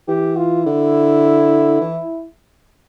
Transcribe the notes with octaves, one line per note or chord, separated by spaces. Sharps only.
E3 G4
F4
D3 E4
E3